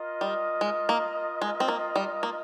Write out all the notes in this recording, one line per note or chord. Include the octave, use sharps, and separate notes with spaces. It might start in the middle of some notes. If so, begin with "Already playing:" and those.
Already playing: F4 A#4 D#5
G3
G#3
A#3
G#3
C4
A#3
G3
A#3